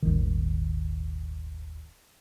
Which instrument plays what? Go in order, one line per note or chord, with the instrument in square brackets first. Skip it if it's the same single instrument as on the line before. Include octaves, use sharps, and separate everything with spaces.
[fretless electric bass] D#1 G#1 D#3